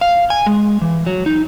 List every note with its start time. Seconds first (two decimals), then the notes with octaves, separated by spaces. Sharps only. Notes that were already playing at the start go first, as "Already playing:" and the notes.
0.01 F5
0.30 G#5
0.46 G#3
0.82 E3
1.06 F#3
1.26 D#4